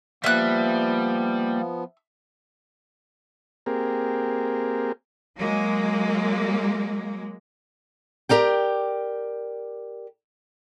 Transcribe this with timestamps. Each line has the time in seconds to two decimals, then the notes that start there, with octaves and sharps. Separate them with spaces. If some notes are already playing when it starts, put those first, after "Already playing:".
0.24 F3 G3 A#3 B3 E5 F#6
3.66 A#3 C4 G4 G#4 A#4
5.37 F#3 G#3 A#3
8.29 G4 A#4 D5 G5